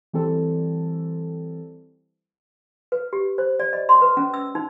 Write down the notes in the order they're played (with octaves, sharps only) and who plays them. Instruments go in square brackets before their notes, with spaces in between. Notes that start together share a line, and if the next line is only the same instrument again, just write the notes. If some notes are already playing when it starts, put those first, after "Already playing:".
[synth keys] E3 G3 C4 A4
[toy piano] B4
G4
C5
D5
D#5
C6
B4
C#4
E6
D#4